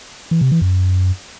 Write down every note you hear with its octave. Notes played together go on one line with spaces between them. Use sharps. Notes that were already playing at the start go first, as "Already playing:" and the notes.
E3
C3
E3
F#2